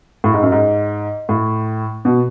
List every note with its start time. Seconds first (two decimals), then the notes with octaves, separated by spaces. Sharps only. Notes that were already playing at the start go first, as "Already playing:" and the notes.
0.24 A2
0.33 G#2
0.42 F#2
0.52 G#2
1.29 A2
2.05 B2